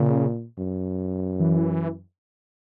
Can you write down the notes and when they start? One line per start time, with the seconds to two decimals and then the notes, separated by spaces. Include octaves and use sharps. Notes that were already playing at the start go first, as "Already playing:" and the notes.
Already playing: A#2 C#3
0.58 F#2
1.40 E3